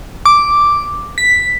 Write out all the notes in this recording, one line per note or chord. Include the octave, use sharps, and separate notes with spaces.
D6
B6